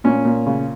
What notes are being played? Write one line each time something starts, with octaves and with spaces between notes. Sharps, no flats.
A#2 C#4
A#2
C#3